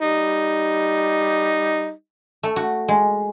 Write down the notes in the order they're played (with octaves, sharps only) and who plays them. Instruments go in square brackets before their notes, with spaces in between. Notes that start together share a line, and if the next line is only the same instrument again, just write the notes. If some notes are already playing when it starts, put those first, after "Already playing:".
[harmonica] G3 D#4
[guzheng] A3
F#4
G#3